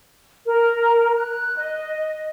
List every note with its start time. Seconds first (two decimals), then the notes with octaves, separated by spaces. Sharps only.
0.46 A#4
1.16 F#6
1.56 D#5